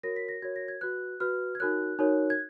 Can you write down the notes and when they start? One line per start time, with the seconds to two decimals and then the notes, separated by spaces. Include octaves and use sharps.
0.03 F#4 A#4 C#5 A#6
0.16 B6
0.29 A#6
0.42 F#4 A#4 C#5 G#6
0.56 A#6
0.68 G#6
0.81 F#4 B4 F#6
1.20 F#4 B4 F6
1.55 G#6
1.59 D#4 F#4 A#4 C#5 F#6
1.99 D#4 F#4 A#4 C#5
2.30 G#6